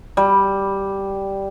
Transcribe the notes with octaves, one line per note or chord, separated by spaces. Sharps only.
G3